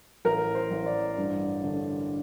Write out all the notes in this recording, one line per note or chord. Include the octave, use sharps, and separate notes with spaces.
A1 A#4
C5
A1
D5
G2
D3